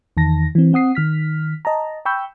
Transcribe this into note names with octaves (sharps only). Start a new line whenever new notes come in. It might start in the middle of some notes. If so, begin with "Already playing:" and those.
E2 D#3 A5 A#6
E3 C4
C4 F#5 D#6 C7
D#3 F6 B6
D#5 A5 A#5
G5 B5 C#6 E6 G6